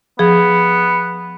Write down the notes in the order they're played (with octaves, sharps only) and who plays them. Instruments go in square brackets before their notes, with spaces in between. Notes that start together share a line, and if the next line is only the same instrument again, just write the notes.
[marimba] F3 G#4 [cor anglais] B3